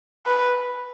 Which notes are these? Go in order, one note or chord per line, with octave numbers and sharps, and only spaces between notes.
B4